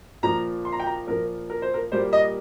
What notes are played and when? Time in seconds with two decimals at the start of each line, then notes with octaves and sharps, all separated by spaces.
0.23 A#2 F3 A#3 A#5
0.65 C6
0.72 A#5
0.80 G5
0.86 A#5
1.07 A#2 F3 A#3 A#4
1.50 A#4
1.62 C5
1.74 A#4
1.92 A#2 G3 A#3 C5
2.13 D#5